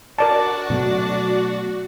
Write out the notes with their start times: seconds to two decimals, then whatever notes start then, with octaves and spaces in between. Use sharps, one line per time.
0.19 D4 F#4 A#4 D5 A5
0.70 B2 F#3 A3